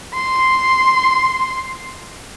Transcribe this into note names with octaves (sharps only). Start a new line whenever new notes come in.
C6